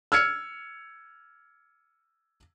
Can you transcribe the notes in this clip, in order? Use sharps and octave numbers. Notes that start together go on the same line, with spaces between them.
E6 F6 G#6 C#7